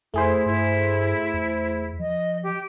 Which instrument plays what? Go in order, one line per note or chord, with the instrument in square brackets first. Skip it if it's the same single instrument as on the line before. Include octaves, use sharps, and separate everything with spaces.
[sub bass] F2 [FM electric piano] A3 G#4 C5 [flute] E4
[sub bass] G2 [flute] E4
[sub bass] E2
[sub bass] F3 [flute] D#5
[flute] G4